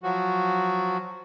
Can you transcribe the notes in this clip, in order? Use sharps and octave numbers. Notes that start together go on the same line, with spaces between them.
F3 F#3 F#4